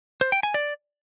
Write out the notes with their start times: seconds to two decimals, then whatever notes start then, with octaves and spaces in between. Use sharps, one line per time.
0.21 C5
0.32 G5
0.43 G#5
0.54 D5